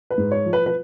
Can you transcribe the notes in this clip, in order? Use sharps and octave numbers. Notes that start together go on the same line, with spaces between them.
B4
G#2
C#5
F3
B4
B4